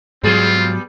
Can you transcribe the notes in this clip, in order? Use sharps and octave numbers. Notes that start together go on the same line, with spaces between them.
G#2 F#3 G3 B3 C4 F4 G#4